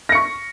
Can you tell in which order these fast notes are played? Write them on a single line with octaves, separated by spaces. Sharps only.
A#6 C#7 C#6